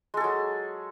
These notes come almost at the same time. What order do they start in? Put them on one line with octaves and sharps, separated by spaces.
G#3 A4 G#4 F#3